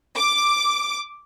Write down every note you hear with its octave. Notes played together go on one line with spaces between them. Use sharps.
D6